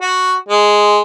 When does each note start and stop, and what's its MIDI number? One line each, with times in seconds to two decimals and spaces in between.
0.02 0.33 66
0.48 1.00 56